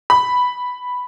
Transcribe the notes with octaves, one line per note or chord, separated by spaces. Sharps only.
B5